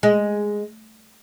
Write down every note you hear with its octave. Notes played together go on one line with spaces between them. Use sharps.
G#3